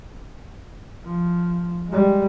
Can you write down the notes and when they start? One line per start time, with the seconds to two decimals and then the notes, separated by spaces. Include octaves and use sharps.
1.05 F3
1.89 G3 G#3